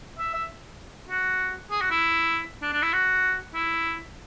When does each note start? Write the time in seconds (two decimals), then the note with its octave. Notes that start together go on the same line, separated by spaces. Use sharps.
0.19 E5
0.34 E5
1.09 F#4
1.71 G#4
1.81 F#4
1.91 E4
2.62 D4
2.73 D4
2.82 E4
2.93 F#4
3.54 E4